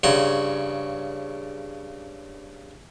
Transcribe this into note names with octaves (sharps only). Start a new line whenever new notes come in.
G2 C#3 F#4 C6